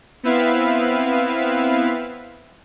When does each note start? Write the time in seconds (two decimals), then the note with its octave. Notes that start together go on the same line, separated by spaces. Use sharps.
0.23 B3 C4 E4 B4 E5 F5